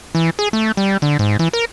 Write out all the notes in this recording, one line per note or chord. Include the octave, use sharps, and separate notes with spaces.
E3
G#4
A3
G3
D3
G#2
E3
A#4